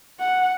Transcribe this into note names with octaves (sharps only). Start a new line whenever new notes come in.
F#5